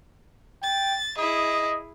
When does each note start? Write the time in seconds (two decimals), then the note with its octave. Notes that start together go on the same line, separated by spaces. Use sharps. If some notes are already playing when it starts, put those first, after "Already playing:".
0.63 G5 A6
1.18 E4 G#4 D#5